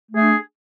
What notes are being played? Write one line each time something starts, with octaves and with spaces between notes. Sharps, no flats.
A3 D4 G#4